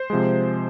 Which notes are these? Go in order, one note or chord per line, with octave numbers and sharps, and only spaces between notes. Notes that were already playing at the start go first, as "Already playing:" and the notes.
Already playing: C5
C3 F3 G#3